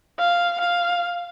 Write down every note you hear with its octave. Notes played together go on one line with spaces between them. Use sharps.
F5
F5